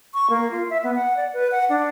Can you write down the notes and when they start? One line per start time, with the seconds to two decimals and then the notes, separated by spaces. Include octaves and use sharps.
0.14 C#6
0.30 A#3
0.51 F4
0.70 E5
0.83 B3
0.95 F#5
1.17 D5
1.33 B4
1.52 F#5
1.69 D4